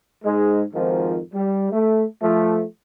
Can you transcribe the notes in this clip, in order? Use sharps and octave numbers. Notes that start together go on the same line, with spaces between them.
G#2 G#3
G#1 F2 G#2 D#3 F3
G3
A3
F3 A3